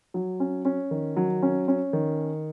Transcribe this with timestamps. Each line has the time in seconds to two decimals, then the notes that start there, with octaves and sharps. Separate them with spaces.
0.14 F#3
0.40 C#4
0.65 C#4
0.91 D#3
1.16 F#3
1.42 C#4
1.68 C#4
1.93 D#3